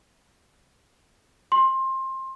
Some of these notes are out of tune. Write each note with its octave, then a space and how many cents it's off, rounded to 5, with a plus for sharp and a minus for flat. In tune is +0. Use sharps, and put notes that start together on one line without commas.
C6 +20